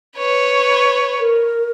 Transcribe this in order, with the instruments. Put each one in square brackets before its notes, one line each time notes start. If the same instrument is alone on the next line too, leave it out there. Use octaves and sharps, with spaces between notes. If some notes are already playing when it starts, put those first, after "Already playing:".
[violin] B4 C#5
[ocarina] A#4